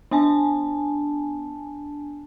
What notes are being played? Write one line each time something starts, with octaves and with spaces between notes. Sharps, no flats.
B3 D4 G#5 A5